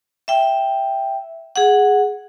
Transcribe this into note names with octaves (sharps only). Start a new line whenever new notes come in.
E5 G5
G#4 F#5